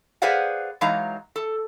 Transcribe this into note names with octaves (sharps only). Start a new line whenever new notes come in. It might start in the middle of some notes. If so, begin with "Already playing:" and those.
G#4 B4 C5 D5 F5 F#5
E3 F#3 G#3 D#4 F5 A#5
A4